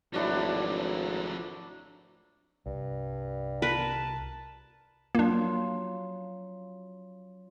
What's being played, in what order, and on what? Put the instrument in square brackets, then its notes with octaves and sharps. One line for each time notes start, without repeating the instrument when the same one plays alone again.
[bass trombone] G#1 [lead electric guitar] F3 A3 [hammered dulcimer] F#3 D4 E4
[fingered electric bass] C2 [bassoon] G2
[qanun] A#4 B4 [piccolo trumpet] A5
[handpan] F#3 F4 [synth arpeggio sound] A#3 D4